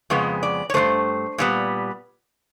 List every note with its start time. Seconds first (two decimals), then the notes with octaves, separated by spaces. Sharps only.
0.10 F2 C#3 G#3 B3
0.43 D5
0.70 C#5
0.74 G2 E3 A3 C5
1.38 A#2 G3 B3